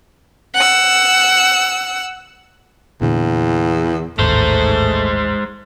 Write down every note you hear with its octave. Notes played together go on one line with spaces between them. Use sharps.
F#5 E6
E2 A#2 D3
A1 D#2 G#2 G#3 A3 C5